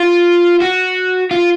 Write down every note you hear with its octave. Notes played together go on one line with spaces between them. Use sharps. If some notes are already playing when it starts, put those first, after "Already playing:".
Already playing: F4
F#4
F4